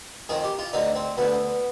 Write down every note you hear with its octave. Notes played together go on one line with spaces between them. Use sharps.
F2 D#3 G#4
G4
F4
D2 D3 D#4
C4
D2 D3 B3